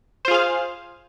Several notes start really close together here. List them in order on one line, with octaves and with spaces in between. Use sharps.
C5 F4 G#4 F5